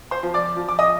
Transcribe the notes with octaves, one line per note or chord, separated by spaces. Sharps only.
C5 C6
F3
D5 D6
F3
D6
D#5 D#6